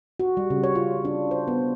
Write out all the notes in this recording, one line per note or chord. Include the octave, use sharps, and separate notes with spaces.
F#4
G3
C#3
C#5
F4
D4
C5
B3